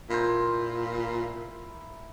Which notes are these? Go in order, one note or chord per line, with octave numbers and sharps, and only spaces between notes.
A#2 E4 A#4 C5